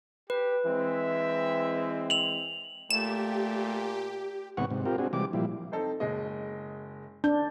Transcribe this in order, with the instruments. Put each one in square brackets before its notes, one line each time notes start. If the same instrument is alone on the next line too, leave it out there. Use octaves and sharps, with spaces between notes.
[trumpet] G4 [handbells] B4
[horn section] E3 G#3 C4 [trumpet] E5
[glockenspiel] F7 F#7
[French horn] A#2 [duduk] A3 [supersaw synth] G4 [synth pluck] E7
[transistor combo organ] D#2 G#2 C3 B3 F#5 C#6
G#2 C3
C4 F4 G4 A#4
C4 D4 F#4 G#4
C3 E3 G3 G#3 D6
A#2 F3 G3 E4
[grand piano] C4 D#4 A4
F#1 G#3 D#5
[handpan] D4 [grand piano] G6